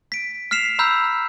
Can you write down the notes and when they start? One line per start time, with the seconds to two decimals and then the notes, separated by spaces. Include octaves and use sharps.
0.12 B6 D7
0.51 F6 B6 C7 E7 F7
0.79 A#5 B5 E6 F6 G6